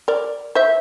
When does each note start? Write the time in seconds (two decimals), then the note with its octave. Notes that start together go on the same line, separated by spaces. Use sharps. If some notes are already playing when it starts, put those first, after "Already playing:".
0.08 A#4 D5
0.55 C5 E5